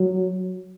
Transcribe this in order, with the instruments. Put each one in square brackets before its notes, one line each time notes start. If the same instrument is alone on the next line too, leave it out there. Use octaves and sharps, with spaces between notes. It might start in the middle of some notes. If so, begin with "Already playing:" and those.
Already playing: [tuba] F#3